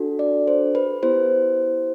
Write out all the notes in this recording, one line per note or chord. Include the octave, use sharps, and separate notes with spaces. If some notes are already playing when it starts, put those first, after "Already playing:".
Already playing: D4 F#4 A4
D5
C5
B4
B3 E4 G4 C5